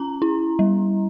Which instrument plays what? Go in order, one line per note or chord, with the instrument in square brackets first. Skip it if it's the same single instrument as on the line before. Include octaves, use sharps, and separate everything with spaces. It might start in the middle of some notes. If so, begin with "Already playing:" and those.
Already playing: [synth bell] C#4 A#5
E4
G3